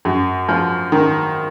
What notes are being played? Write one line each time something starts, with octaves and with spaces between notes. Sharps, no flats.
F#2
F3
D#3